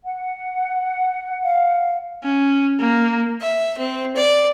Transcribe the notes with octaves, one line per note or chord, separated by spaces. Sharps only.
F#5
F5
C#4
A#3
E5
C4
D5